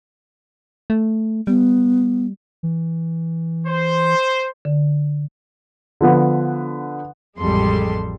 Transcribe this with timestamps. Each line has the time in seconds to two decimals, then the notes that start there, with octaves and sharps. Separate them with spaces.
0.90 A3
1.47 G3 B3
2.63 E3
3.67 C5
4.65 D3
6.01 D3 F3 B3
7.39 A1 F2 G3 G#3 A4 C6